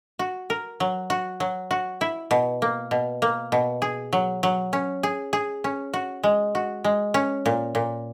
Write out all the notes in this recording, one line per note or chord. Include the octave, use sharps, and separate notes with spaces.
F#4
A#4
F#3
F#4
F#3
F#4
E4
B2
A#3
B2
A#3
B2
G#4
F#3
F#3
C#4
G#4
G#4
C#4
F#4
G#3
F#4
G#3
C#4
A#2
A#2